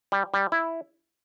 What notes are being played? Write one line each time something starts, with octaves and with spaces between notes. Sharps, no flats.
G3
G3
E4